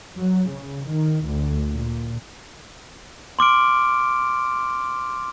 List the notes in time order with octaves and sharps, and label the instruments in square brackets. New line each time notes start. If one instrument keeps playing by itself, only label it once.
[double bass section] F#3
C#3
D#3
D2
A#2
[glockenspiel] C6 D6 F6 D7